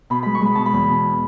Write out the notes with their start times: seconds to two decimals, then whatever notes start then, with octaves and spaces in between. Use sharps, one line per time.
0.10 B2 B5
0.23 G#3 B5
0.35 C#6
0.41 G#3 B5
0.55 B2 A5
0.66 B5
0.74 E2
0.89 B2